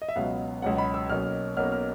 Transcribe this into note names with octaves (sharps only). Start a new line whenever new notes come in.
D#5
E5
C#2 B2 F#3 B3 F5
C#2 B2 F#3 B3 F#5
B5
E6
B1 B2 F#3 A#3 C#4 F6
B1 B2 F#3 A#3 C#4 F6
F6